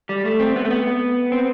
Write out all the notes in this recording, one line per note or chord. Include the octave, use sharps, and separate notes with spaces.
G3
A3
C4
B3
A3
B3
C4